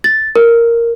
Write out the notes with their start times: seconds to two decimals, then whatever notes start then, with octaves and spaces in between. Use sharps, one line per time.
0.04 A6
0.36 A#4